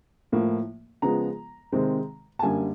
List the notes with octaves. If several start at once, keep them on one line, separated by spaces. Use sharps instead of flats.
A2 F3 A#3
C#3 F3 G#3 B3 A#5
C3 D#3 G#3 C4
A5
F#2 D3 G3 A#3 G#5